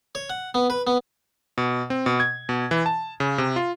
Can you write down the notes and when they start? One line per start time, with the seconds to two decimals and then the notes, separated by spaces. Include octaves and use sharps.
0.15 C#5
0.30 F#5
0.54 B3
0.70 B4
0.87 B3
1.58 B2
1.90 C4
2.06 B2
2.20 G#6
2.49 B2
2.71 E3
2.86 A5
3.20 C#3
3.38 C3
3.56 F4